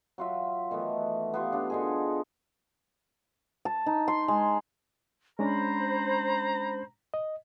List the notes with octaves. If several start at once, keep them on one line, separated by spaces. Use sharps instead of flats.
F#3 F4 E5
D#3 E3 A3 B3
B3 F4 G4
D4 F4
D3 D#4 G#4
A5
D#4
C6
G#3
G#3 C#4 D4 C5 A#5 B5
D#5